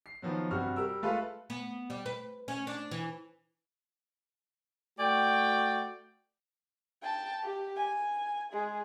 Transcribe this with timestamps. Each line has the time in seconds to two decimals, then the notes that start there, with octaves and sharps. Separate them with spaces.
0.06 C7
0.22 D#3 F3 F#3 B3
0.51 G2 C3 F#4 F6
0.76 G3 A#4 E6
1.03 G#3 A3 F4 A4 B4 F5
1.50 B3
1.90 G3
2.06 B4
2.48 C#4
2.67 D4
2.91 E3
4.98 A3 F#4 D5 G5
7.02 G5 A5
7.43 G4
7.76 G#5
8.53 G#3 G#4